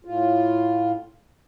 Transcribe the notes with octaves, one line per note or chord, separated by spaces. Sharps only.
A2 F4